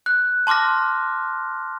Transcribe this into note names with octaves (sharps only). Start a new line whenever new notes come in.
F#6
A5 C6 D6 F6 A#6